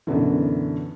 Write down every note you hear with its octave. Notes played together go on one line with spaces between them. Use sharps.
F#2 B2 D3 E3